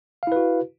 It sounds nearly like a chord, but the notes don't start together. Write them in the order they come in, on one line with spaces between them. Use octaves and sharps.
F5 E4 B4 F#4